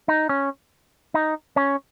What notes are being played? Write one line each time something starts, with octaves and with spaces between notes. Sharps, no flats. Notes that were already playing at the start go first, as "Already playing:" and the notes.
D#4
C#4
D#4
C#4